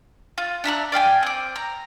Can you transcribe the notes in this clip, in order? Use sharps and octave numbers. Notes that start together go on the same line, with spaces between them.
F4
D4 E5 A#5 F#6
D5 F5 G5 G#5
C4 D6
A#5